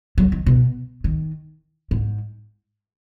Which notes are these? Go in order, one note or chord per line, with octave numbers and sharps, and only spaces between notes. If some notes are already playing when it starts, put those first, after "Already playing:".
F#3
D#3
B2
D#3
G#2